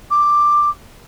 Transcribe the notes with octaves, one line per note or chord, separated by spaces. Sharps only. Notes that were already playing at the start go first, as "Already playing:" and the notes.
D6